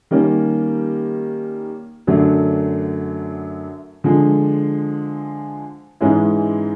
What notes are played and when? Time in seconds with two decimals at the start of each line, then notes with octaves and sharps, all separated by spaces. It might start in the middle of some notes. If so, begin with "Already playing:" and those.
0.11 D#3 G3 A#3 C#4
2.07 F#2 D3 F#3 A3 D4
4.04 D3 F3 G#3
6.00 G#2 E3 G#3 C#4 E4